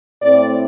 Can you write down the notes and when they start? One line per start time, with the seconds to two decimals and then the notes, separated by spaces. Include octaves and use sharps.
0.22 A2 A3 C4 D5